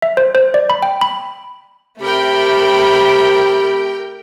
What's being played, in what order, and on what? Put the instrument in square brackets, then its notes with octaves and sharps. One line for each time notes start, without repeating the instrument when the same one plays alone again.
[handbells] E5
C5
C5
D5
B5
G5
B5
[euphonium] C3 [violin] A3 B5 [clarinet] G4 [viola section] A#4 G5